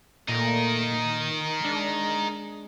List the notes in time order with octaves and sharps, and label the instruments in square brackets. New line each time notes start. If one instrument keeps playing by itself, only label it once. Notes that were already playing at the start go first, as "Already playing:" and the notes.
[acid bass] A#2 [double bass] A3 A#3 [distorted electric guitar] D#4 A#4
[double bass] D#3
[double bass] G#3 [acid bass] D4